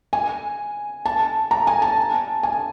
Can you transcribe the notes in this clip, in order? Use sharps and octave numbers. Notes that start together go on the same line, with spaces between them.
G#5
A5
A#5
G#5
A5
G#5